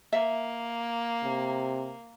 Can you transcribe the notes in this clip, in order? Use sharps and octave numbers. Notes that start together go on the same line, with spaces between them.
A#3 E5
C3